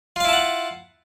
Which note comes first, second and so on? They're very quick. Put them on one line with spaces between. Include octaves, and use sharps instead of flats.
F4 F5 E4 A5 F#5